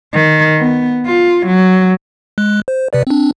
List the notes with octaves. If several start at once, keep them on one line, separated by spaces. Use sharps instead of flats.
D#3
B3
F4
F#3
G#3 F#6
C5
C3 B4 D5
C4 D4